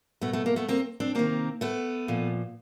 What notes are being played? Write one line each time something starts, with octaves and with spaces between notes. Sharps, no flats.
B2 A3 B3
A3 B3
A#3
A3 B3
A#3 C4
C4 D4
C3 D#3 A#3 C4
A3 B3
A#2 F3